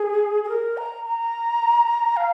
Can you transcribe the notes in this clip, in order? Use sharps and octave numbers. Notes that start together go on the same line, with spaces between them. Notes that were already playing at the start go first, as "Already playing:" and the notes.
Already playing: G#4
G#4
A#4
A#5
A#5
F5